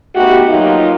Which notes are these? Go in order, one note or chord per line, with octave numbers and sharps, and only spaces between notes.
A3 B3 D#4 F#4 G4
F3 F#3 A#3 D#4 F4 G4